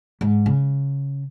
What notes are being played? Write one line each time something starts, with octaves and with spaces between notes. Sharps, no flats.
G#2
C#3